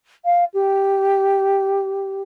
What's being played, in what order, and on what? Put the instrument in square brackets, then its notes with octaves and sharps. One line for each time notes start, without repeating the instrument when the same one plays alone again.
[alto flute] F5
G4